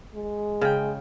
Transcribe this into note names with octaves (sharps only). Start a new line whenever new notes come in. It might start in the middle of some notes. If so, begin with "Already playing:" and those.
G#3
C#3 G5